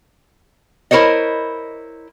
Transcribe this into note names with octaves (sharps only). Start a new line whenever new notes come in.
E4 A#4 C5 C#5 D#5